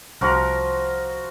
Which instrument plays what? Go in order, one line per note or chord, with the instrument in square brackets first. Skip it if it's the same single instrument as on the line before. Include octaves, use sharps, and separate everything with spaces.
[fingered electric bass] C2 [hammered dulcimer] F3 F#4 A#4